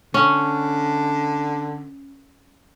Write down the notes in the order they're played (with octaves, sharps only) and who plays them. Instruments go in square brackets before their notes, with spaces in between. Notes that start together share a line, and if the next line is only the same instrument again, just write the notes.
[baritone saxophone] D3 [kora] C#4